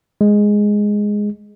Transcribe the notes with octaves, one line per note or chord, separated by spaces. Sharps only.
G#3